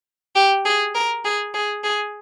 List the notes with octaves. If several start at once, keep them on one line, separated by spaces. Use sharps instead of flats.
G4
G#4
A#4
G#4
G#4
G#4